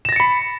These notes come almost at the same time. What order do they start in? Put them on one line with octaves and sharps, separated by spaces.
E7 A#6 A6 C#7 B5